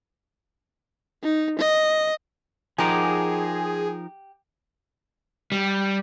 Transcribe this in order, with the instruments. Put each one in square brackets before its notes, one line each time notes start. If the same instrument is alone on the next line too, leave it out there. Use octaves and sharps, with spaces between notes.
[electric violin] D#4
D#5
[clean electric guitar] F3 D#4 A#4 [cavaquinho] G4 F#5 [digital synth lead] G#4
[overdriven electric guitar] G3